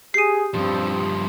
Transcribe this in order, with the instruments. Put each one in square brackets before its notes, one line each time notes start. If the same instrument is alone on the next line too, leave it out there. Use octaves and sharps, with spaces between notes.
[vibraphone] G4 D#6 [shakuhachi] G#4 [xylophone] C7 D#7
[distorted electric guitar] G2 F3 [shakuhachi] C4